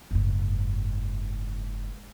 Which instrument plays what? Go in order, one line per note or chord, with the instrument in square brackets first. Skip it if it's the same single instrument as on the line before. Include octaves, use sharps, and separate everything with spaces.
[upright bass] F#1 G#2